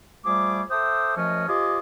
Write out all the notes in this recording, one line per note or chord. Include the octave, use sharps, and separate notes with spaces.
F3 G3 A3 G#4 D6
A4 C5 E5 G5 D6 D#6
F#2 F3 A3 C#4 D#5
F4 G4 C5 D#5 G#5 D6